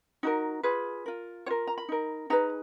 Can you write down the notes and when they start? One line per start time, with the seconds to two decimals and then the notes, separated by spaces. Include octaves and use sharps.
0.23 D#4 F#4 A#4
0.63 F4 G#4 B4
1.06 F4 A#4
1.46 F4 A#4 C#5
1.67 A#5
1.78 B5
1.89 D#4 A#4
2.30 D#4 G#4 B4 A#5